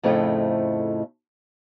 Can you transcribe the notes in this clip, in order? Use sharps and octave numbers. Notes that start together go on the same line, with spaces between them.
F2 A2 C#3 F3 A3 D#4